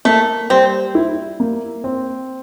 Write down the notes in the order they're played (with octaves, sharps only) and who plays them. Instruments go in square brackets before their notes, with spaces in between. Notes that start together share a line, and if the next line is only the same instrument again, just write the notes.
[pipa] A3 [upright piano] A#3
[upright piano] G3 [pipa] C4
[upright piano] E4
A#3
C4